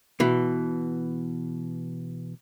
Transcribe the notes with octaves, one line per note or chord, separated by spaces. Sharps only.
B2 E3